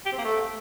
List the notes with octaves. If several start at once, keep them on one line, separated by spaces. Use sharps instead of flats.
G4
C4
A#3
A3